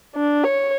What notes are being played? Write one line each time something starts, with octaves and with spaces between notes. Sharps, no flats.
D4
C#5